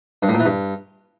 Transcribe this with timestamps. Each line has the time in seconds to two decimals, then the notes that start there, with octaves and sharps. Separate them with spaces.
0.23 G2
0.28 A2
0.34 A#2
0.40 E3
0.45 G2